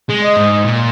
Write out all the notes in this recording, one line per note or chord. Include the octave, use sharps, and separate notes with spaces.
G#3
D#5
G#2
A#2